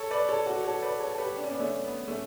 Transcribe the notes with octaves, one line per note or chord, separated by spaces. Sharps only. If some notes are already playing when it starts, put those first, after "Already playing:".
Already playing: A4 C#5
B4 D5
A4 C#5
F#4 A4
A4 C#5
B4 D5
A4 C#5
A4
G4 B4
D4
C#4
B3 D4
A3 C#4
B3
A3 C#4